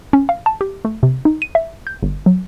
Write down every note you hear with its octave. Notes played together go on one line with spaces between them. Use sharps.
C#4
F5
A5
G4
A3
C3
D#4
D#7
E5
G6
G1
F#3